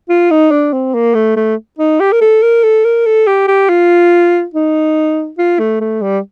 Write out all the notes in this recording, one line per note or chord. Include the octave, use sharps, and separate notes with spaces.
F4
D#4
D4
C4
A#3
A3
A3
D#4
G4
A#4
A4
A#4
A4
A#4
A4
G4
G4
F4
D#4
F4
A3
A3
G3